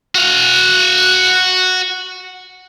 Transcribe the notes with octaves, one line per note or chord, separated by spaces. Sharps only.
F#4 F5